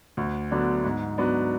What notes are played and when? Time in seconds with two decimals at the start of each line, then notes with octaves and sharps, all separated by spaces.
0.17 D2
0.51 D3 F#3 B3 D4
0.84 G#2
1.18 F#3 B3 D4